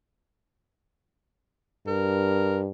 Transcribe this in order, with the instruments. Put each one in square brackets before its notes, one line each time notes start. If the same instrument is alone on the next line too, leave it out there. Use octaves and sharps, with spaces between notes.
[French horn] G2 [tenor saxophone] A#4